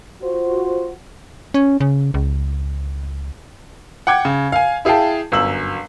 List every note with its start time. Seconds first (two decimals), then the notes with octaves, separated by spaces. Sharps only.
0.22 F4 F#4 C5
1.54 C#4
1.80 C#3
2.14 C#2
4.07 F#5 G5 D6 G#6
4.25 C#3
4.52 F5 G#5
4.85 E4 G#4 F5 G5 A5
5.32 G1 F#2 E6 F#7